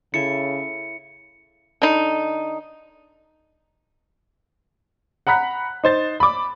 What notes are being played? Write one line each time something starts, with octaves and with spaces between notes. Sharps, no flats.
C#3 E4 A4 E5 C#7
D3 D#4
F#5 A#5 B5 F#6 B6
D#4 C5 A6
B5 D6